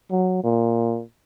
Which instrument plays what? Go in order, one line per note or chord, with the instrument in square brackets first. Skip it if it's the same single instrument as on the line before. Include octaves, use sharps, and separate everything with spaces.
[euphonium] F#3
A#2